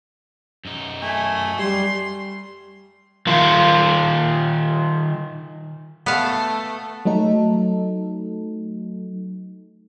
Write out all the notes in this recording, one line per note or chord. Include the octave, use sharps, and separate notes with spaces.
F#2 D#4
A3 G#5
G3 C6
D#3 F4
A3 B3 F5
F#3 A3 D#4 A4